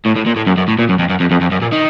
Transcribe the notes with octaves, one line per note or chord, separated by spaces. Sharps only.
A2
A2
A#2
A2
F#2
F#2
A2
A#2
F#2
F2
F#2
F2
F2
F2
F#2
A#2
D#3